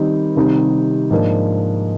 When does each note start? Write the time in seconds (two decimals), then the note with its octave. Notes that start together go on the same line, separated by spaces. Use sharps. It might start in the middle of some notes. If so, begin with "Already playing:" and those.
Already playing: D#3 G3 C4 D#4
0.36 C3 D#3 G3 C4 D#4
1.11 G#2 F3 A#3 D4